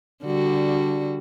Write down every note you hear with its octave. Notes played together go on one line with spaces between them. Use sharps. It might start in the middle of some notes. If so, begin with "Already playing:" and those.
D3 G3 F#4